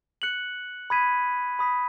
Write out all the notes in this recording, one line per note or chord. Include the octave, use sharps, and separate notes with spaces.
F#6 C#7 F#7
B5 D#6 G#6 B6 D#7
B5 D#6 B6